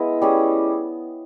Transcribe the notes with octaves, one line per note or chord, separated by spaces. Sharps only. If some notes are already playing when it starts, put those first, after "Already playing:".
Already playing: G#3 B3 E4 D#5
G3 C#4 G#4